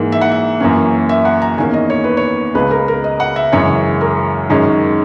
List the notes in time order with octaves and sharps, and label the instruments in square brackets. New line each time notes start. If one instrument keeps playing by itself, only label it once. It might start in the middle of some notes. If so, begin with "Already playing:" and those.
Already playing: [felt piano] G#2 E3 A#3
E5
F#5
E5
F#2 E3 A#3 C#4
E5
F#5
A#5
E2 D#3 A#3 C#4 G#5
D#5
C#5
B4
C#5
C#2 C#3 G#3 B4
A#4
A#4
D#5
F#5
E5
F#2 C#3 E3 G#3 C#5
A#4
F#2 D#3 G#3 C#4